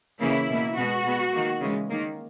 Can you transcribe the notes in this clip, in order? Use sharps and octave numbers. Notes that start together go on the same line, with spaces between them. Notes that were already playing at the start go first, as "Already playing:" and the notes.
C#3 E3 A#3 E4
B2 A#3
B2 G#3 B3 F#4
B2 G#3 B3
D#3 A#3
C#3 E3 G#3
D#3 A#3